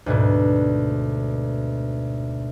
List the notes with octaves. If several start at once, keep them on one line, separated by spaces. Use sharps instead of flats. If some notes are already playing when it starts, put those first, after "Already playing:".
D2 G#2 B2